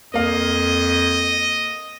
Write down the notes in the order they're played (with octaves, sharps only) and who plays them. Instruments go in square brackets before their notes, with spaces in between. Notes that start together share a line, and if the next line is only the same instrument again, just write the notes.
[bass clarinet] F2 [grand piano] A#3 F5 [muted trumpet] D#5